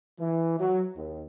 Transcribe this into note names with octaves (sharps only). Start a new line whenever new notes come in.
E3
F#3
D#2